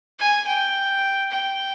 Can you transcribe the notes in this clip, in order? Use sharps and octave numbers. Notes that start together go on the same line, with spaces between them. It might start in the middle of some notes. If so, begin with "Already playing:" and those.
G#5
G5
G5